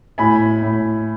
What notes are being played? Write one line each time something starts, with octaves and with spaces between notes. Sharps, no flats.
A2 G#5 B5
A2